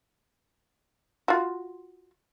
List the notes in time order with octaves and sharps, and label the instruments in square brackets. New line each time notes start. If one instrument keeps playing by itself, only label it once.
[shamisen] F4 F#4